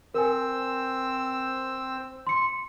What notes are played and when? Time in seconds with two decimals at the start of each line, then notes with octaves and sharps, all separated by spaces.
0.14 C4 A#4 G#5 E6
2.27 C6 C#7